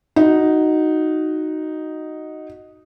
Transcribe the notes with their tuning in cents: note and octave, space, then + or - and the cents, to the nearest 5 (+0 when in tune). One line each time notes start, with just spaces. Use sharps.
D#4 +0 F#4 +0